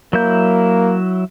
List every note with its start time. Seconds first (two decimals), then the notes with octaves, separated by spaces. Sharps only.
0.13 F#3 A#3 E4 G6